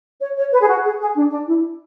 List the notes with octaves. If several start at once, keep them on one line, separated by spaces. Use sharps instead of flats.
C#5
C#5
B4
G#4
F#4
G#4
G#4
D4
D4
E4